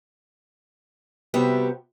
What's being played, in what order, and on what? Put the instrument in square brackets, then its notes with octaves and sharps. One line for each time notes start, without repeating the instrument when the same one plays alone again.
[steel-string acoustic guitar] C3 G3 B3 F#4 G4 E5